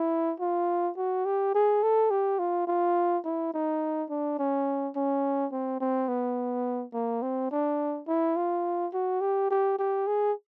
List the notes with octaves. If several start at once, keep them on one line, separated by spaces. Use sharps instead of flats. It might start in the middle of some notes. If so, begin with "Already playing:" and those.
Already playing: E4
F4
F#4
G4
G#4
A4
G4
F4
F4
E4
D#4
D4
C#4
C#4
C4
C4
B3
A#3
C4
D4
E4
F4
F#4
G4
G4
G4
G#4